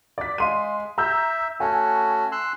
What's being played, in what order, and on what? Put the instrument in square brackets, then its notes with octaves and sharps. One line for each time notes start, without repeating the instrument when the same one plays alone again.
[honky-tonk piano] D5 B6
[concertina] G#3 [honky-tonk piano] F5 C6 D#7
[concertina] E5 [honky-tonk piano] A#5 E6 G6
[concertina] A3 C#4 F#4 [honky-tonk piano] G#5
[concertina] C6 E6 F#6